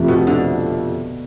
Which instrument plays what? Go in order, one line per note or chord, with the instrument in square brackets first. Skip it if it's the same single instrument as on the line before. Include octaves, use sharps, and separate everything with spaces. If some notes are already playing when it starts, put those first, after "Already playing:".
Already playing: [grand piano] F2 C3 F3 A3
[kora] B2
D3